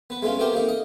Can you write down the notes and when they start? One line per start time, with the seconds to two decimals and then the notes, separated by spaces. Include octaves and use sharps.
0.10 B3 B4
0.22 G#3 A3 B3 C#4 F4
0.39 A3 B3 C4 G4 A#4 G5
0.53 A#3 D#4
0.69 D#5